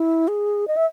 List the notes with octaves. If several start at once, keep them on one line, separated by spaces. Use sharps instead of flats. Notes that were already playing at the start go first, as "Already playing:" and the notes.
Already playing: E4
G#4
D#5
E5